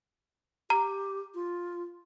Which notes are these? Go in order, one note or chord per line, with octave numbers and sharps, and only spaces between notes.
G4 A#5
F4